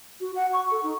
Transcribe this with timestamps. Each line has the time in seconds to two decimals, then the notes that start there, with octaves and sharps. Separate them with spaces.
0.20 F#4
0.36 F#5
0.53 C#6
0.71 A4
0.83 D#4